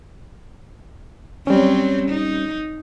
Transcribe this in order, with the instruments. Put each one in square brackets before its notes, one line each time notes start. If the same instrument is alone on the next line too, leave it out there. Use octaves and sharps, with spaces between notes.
[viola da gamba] F#3 C4 [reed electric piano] G3 C#4
[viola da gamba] D#4